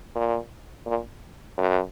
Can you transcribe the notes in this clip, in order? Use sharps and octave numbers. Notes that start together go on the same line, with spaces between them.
A#2
A#2
F#2